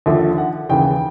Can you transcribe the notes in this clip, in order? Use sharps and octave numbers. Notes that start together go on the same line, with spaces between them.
D#2 D3 F3 E5
F#5
D#2 C#3 E3 G5